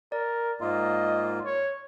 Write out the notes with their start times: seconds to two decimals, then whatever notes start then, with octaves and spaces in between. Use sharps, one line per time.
0.12 A#4 D5
0.61 G#2 A#3 F4 D#5
1.45 C#5